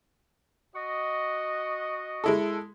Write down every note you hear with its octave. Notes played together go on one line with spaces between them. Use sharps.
F#4 D#5
G#3 E4 A4